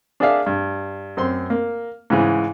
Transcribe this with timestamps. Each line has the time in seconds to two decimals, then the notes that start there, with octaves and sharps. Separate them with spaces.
0.20 D4 G#4 A#4 D5 E5 F5
0.46 G2
1.17 F#2 C4 C6
1.50 A#3
2.10 G#2 C#3 E3